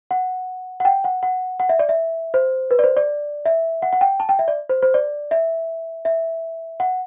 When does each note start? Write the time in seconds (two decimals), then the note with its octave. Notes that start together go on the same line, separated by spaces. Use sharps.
0.11 F#5
0.80 F#5
0.85 G5
1.04 F#5
1.23 F#5
1.60 F#5
1.69 E5
1.79 D5
1.89 E5
2.34 C5
2.71 B4
2.79 D5
2.84 C5
2.97 D5
3.46 E5
3.82 F#5
3.93 F#5
4.01 G5
4.20 A5
4.29 G5
4.39 E5
4.48 D5
4.69 C5
4.82 C5
4.94 D5
5.31 E5
6.05 E5
6.80 F#5